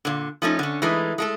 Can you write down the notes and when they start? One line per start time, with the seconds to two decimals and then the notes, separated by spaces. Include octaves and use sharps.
0.05 A#2 D3
0.42 F3 A3 C#4 D#4
0.59 D3 C#4
0.82 E3 G#3 A3 D#4
1.18 G#3 A3 A4